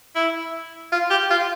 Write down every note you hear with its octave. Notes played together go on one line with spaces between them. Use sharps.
E4
F4
G4
F4